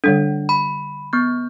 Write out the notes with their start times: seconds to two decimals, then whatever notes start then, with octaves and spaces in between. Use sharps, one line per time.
0.04 D3 G3 D4 A4
0.49 B5
1.13 B3 G6